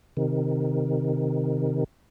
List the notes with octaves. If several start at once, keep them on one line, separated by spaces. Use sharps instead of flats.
C3 D#3